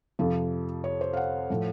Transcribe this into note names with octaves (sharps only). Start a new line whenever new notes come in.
F2 C3 F3
C#5
C5
F5
F#5
A2 F3